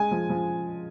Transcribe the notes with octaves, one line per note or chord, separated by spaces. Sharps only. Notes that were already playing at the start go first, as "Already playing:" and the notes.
Already playing: G#3 G#5
F3
F3